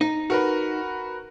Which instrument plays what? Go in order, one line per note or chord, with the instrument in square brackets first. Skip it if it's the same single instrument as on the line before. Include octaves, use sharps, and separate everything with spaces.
[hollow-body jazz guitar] D#4
[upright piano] F#4 A#4 B4